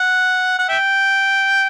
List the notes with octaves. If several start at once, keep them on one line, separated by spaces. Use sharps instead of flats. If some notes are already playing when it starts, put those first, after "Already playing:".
Already playing: F#5
F#5
E5 G5